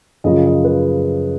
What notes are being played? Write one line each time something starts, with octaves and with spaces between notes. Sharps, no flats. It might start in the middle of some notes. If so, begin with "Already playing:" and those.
F#2 C#3 F3 D#5
D#5
B4